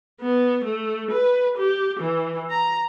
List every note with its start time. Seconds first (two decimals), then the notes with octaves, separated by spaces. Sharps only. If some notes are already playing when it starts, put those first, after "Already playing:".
0.21 B3
0.64 A3
1.11 B4
1.58 G4
2.00 E3
2.51 A#5